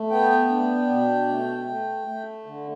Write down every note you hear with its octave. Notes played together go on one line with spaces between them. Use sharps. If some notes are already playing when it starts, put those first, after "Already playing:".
Already playing: A3
B3 G5
D4
B2
A3
A3
A3
D3